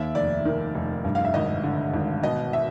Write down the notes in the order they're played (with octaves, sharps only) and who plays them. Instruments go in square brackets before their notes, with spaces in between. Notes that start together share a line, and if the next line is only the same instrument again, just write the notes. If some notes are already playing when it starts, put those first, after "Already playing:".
Already playing: [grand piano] D#2 E5
F1 D5
D#3
F1
G2
F5
E5
G#1 D#5
D3
G#1
B2 D#5
E5